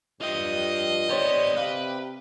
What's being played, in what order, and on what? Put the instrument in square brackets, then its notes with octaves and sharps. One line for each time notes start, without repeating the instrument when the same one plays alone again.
[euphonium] G2 [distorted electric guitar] F4 G5 [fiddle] D#5
[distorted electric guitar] B3 G4 [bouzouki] D4 C5 C#5
[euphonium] C3 [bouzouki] G4 F5 [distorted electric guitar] B4